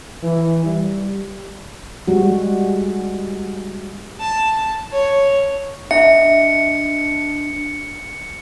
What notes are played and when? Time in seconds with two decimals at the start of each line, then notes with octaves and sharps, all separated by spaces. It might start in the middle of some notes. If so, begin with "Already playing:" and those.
0.23 E3
0.65 G3
2.07 G3 G#3 F#4
4.20 A5
4.93 C#5
5.91 D4 D#5 E5 A#5 C#7